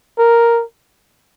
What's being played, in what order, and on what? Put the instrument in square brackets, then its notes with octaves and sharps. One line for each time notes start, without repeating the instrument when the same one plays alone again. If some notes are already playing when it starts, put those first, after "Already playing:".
[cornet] A#4